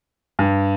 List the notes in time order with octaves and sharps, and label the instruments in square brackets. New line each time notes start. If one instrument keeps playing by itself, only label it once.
[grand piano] G2